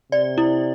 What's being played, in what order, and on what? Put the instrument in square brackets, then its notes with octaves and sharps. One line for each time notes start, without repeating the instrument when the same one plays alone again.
[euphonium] C3 [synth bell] D5
[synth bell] E4